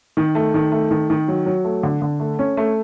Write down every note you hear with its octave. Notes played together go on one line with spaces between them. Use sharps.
D#3
A3
D#3
A3
D#3
D#3
F#3
F#3
A3
D3
D3
A3
C#4
A3